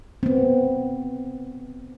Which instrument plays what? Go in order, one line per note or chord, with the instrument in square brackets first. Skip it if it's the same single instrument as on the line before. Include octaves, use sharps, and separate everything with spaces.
[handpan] B3 C4